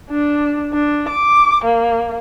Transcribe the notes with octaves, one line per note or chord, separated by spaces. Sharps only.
D4
D4
D6
A#3